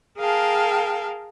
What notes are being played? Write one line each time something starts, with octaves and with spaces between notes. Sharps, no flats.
G#4 A#4 F5 G5 A5